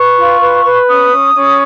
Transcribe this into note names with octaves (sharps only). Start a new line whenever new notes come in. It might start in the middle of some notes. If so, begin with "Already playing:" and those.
Already playing: B4 C#6
F4
B4
B4
C#4 D#6
C#4
C#4